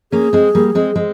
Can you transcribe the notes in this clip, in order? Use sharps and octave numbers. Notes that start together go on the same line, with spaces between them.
A#3 C#4 G#4
G#3 C4
G3 A#3
G#3 C4
G#3 C4